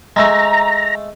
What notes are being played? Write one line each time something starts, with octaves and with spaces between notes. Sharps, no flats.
G#3 A3 A#5